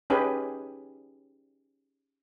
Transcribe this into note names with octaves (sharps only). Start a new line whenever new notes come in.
C#4 D#4 G4 G#4 B4